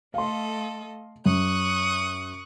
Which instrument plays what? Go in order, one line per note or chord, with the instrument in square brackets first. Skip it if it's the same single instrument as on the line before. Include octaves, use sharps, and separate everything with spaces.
[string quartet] A3 A4 D#5 [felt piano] F5 C6
[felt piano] F#2 [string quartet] C#6 D#6 F#6